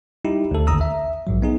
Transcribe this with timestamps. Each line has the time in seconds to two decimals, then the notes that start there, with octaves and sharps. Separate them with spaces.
0.25 G3 D#4 E4 G4
0.51 D2 A4
0.67 A1 D#2 D3 A#5 D#6 E6
0.81 E5
1.27 A#1 G#2 F#3
1.42 B3 D#4 G#4